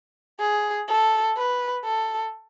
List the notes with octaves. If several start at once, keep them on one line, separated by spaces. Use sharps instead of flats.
G#4
A4
B4
A4